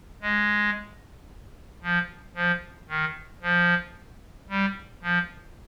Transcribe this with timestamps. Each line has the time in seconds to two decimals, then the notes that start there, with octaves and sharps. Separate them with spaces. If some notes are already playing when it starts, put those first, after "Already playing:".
0.22 G#3
1.82 F3
2.35 F3
2.89 D#3
3.42 F3
4.49 G3
5.02 F3